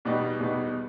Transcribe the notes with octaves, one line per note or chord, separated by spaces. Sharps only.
E2 B2 G3 B3 D#4
E2 B2 G3 B3 D#4